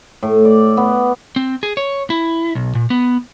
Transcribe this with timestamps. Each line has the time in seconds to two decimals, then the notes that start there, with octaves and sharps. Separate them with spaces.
0.23 A2
0.45 D5
0.77 B3
1.36 C4
1.63 G#4
1.77 C#5
2.10 E4
2.55 B1
2.75 A#2
2.90 B3